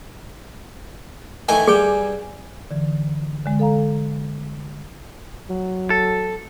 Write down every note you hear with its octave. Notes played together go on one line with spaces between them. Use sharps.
D#3 E3 A3 G#5
G2 G3 G#4 G5
D3 E3
D3 G#3
A4 F5 A#5
F#3
A4